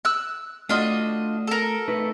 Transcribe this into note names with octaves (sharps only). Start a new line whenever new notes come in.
E6 F#6
A3 D4 F4 F#4 D#5
A4 A#4
A3 D#4 B4